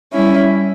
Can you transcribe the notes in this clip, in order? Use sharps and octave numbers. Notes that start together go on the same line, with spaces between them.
G3 C#4 E4